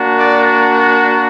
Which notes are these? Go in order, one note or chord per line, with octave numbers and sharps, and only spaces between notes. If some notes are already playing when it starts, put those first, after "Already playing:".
Already playing: A#3 D4 F#4
D5